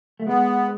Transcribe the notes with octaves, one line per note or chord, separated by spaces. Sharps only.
A3
G#3 B3